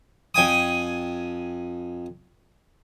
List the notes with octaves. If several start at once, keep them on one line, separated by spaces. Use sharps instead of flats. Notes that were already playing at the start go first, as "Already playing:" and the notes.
F2 G5 G#5 D#6